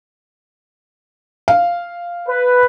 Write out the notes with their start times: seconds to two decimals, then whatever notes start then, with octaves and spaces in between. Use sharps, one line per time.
1.48 F5
2.28 B4